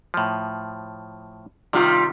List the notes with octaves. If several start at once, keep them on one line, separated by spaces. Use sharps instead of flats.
A2 F3
C3 D#3 G3 F4